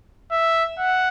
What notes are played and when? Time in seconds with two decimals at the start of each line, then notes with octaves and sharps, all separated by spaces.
0.31 E5
0.78 F#5